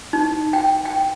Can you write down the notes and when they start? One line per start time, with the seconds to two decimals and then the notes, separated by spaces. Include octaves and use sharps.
0.13 D#4
0.53 G5
0.85 G5